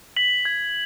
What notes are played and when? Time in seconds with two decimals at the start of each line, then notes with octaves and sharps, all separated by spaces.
0.17 B6 F#7
0.45 G#6